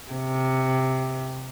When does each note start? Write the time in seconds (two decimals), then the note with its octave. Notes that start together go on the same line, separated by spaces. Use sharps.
0.11 C3